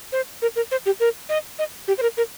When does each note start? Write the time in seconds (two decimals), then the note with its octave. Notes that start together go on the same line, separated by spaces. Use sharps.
0.12 C5
0.42 A#4
0.56 A#4
0.71 C5
0.86 G4
1.00 A#4
1.29 D#5
1.59 D#5
1.88 G4
1.98 C5
2.02 A#4
2.17 A#4